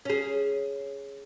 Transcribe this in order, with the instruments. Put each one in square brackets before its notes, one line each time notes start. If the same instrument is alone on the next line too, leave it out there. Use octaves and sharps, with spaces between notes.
[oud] C#4 G#4